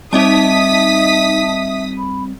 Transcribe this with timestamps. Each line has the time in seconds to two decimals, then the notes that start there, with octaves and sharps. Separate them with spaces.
0.13 G3 C4 D#4 D#5 E5 A5 D#6 B6
1.98 B5